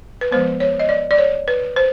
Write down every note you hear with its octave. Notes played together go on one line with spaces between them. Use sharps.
B4
F3 G#3 B3 C5
C#5
D#5
D5
D5
C#5
B4
C5